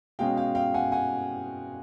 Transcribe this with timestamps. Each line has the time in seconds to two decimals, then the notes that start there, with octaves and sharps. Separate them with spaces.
0.19 B2 G#3 C#4 F5 G5
0.37 F5 G5
0.55 F5 G5
0.74 F#5 G#5
0.92 F#5 G#5